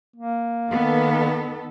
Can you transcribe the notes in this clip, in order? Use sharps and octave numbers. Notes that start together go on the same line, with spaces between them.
A#3
D#3 B3 A4